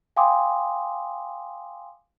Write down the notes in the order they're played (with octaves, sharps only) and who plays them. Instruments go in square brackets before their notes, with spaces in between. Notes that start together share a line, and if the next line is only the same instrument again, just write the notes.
[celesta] F5 G5 G#5 C6 D6 D#6